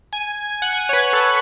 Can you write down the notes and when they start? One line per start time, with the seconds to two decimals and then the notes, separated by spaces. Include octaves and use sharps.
0.13 G#5
0.62 F#5
0.73 G#5
0.89 C#5
0.93 B4
1.13 A4